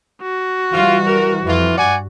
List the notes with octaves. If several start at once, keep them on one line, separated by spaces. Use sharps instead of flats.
F#4
E3 G3 F4
A#4
F2 E3 F4
G2 D5 F#5 G#5